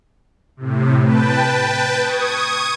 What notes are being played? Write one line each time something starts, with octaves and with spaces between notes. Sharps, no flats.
A2 C3
B4 G5 A5
C#6 D#6 G#6